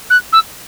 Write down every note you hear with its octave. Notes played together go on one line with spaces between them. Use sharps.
F#6
E6